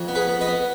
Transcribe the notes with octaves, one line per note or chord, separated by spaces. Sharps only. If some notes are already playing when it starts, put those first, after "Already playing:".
Already playing: F2
B3
G#4 B4
B3
B4 D#5
B3